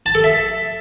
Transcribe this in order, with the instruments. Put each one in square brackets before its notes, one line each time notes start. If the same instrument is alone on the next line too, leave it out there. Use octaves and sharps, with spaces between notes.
[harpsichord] A5
A4
E5